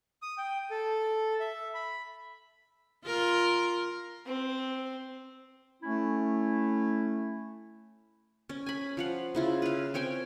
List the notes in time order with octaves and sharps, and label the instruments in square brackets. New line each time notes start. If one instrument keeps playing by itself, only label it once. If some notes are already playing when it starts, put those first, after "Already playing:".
[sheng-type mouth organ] D#6
G5
A4
E5
B5
[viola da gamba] F4 A#4
[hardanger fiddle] C4
[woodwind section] A3 C#4 E4
[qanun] C#4
G#5 B5
F3 F5 F#5
C#3 E4 F4
B4 F5
C4 C#5 G5 G#5